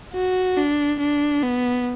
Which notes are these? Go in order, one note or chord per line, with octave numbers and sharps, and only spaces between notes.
F#4
D4
D4
B3